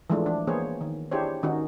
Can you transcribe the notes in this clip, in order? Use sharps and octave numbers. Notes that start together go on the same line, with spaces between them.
E3 F3 G#3 A3 D4
D4
E3 A#3 B3 G#4 C5 C#5
D#3
D4 E4 G4 G#4 C5 C#5
D#3 C#4 D#4 F#4